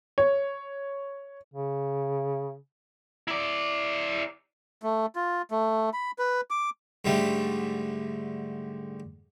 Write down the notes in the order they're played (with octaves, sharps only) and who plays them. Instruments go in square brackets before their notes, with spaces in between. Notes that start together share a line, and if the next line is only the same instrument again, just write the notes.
[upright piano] C#5
[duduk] C#3
[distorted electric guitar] E4 D5
[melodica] A3
F4
A3
B5
B4
D6
[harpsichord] G#2 D3 G3 A3